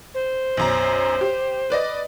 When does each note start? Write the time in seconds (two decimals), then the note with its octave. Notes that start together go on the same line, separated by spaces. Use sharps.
0.14 C5
0.57 B1 F#2 A#5
1.21 G4
1.70 B4 D5 D#5